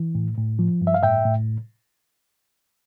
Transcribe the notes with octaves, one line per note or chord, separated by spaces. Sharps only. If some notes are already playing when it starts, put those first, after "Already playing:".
Already playing: E3
A2
A2
F3
G2
E5
F5
A2 E5 G5
A2